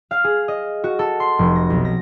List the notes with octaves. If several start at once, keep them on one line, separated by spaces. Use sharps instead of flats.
F5
G#4
D#5
F#4
A4
C6
F1
A#6
B1
A#6